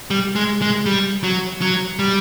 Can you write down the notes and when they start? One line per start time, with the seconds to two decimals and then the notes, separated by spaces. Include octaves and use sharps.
0.10 G3
0.35 G#3
0.62 G#3
0.86 G3
1.24 F#3
1.61 F#3
1.99 G3